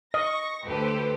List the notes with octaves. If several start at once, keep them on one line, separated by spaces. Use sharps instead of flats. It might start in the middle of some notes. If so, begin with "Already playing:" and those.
D#5 C#6 A#6
D2 G4 A4 B4 C5